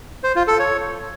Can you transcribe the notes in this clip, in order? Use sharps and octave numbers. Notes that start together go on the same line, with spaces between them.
C5
F4
A4
C#5